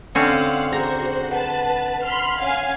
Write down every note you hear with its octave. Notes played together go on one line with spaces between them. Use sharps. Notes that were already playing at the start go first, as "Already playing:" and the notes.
D3 C4 C#4 F5 F#5
F#4 G#4 C5 A#5 G6
B4 F#5 A5
B5 C6 F6
C#4 F5 F#5 G#5 F6